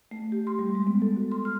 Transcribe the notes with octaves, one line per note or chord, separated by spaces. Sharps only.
A3
G4
C6
G3
G#3
B3
A4
F#4
C6
F6